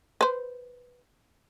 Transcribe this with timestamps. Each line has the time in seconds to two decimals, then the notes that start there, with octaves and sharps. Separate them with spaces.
0.21 B4 C5